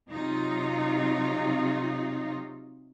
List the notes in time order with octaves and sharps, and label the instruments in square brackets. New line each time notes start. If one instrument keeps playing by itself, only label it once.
[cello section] C3 F#3 D#4 F4